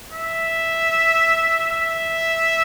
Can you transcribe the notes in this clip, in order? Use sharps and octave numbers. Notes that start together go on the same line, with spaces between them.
E5
E5